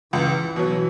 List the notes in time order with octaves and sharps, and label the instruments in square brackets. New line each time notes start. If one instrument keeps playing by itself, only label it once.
[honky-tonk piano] C#2 [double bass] E3
[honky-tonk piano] B2 F#3 [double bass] E3